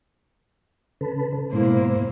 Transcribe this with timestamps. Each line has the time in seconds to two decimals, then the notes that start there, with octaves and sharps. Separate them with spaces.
1.01 C#3 A4 B4
1.52 G#2 B2 A#3 E4 C5